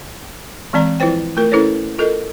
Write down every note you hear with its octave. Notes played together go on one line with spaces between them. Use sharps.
E3 G#3 C4 D5 A#5
F3 E4 F4 B4 C5 G5
A3 F4 A#4
C#4 E4 A4 B4 C#5
F4 A4 A#4 D#5